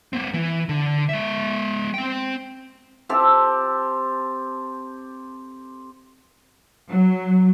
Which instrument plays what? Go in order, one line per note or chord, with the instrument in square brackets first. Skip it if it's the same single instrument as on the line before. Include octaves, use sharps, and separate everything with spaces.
[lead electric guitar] A#3 C4
E3
D3
G#3 E5
C4 G5
[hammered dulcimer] C4 G4 A4
[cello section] F#3